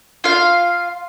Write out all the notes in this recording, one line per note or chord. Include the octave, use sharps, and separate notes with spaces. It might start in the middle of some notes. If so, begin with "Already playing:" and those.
F4 F5